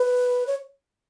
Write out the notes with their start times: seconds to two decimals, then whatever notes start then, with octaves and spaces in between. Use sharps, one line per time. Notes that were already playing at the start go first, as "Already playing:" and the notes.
Already playing: B4
0.47 C#5